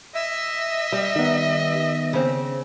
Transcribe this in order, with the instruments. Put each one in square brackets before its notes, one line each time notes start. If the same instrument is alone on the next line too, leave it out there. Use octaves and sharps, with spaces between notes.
[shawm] D#5 [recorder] E5
[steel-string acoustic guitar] G3
[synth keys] D#3 B3
[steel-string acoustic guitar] C#3 C4